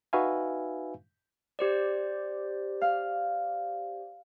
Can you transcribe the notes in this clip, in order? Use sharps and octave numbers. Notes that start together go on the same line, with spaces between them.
D#4 F#4 B4 E5 F5 G#5
G4 C5 D5
F5